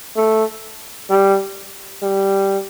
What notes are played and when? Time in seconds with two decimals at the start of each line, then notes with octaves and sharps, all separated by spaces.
0.16 A3
1.10 G3
2.03 G3